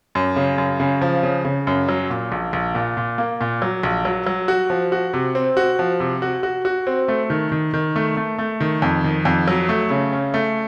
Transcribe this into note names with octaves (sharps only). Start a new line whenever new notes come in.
F#2
C#3
F#2
C#3
F3
C#3
C#3
F#2
F#3
A#2
A#1
A#1
A#2
A#2
A#3
A#2
F#3
A#1
F#3
F#3
F#4
F3
F#4
C3
C4
F#4
F3
C3
F#4
F#4
F#4
C4
A3
D#3
D#3
D#3
A3
A3
A3
D#3
F2
D#3
F2
F#3
A3
C#3
C#4
A3